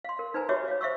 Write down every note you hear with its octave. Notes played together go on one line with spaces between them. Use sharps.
F5 C6
A#4
D#4 B4 C5 G#5 A#5
F#4 G4 C#5 E5 D6
C#5 F5
C5 E5 F5 C#6 E6